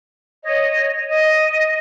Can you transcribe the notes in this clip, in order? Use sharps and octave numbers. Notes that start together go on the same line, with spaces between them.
C#5 D#5
D#5